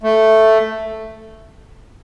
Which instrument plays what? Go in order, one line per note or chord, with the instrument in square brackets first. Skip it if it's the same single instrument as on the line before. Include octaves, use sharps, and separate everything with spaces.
[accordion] A3